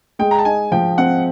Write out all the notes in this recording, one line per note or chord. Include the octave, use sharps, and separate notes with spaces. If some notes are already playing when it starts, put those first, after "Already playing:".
G#3 G5
A#5
A5
D#4 G#5
F3 G5
C4 F#5